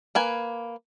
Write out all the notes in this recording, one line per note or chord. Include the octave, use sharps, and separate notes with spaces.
A#3 B4 G#5